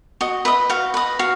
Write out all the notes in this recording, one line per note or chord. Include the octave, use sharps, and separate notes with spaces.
F#4 D#5
B4 D#5 E5
F#4 F5
B4 D#5
F#4 F5